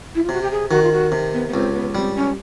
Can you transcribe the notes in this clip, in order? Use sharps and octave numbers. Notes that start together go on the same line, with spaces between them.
E4
F4
C3 F#4
G4
G#4
D#3 F#4
F4
F#4
C3
B3
B3
C#2 C4
B3
G3 C4
C#4